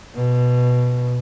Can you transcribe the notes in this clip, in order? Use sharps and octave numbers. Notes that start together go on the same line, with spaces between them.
B2